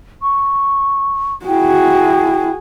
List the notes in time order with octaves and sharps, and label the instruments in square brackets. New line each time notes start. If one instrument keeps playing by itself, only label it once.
[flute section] C#6
[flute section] E4 G5 [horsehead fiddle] F#4 G#4